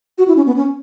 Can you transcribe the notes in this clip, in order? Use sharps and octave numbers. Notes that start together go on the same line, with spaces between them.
F#4
E4
C#4
B3
C#4